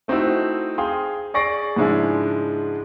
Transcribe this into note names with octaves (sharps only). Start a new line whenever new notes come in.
A3 C4 D#4 E4 F#4
G#4 F5 G5 C6 D#6
G#4 D5 C#6 A#6 C7 D7
G#2 C#3 F3 G#3 D4 E4